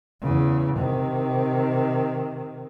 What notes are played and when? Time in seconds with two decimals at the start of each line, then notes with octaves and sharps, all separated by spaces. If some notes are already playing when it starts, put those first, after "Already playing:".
0.21 E2 C#3
0.77 C3 D#3